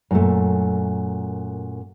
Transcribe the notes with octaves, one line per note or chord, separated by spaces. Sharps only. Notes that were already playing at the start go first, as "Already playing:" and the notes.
F#2 A#2 A3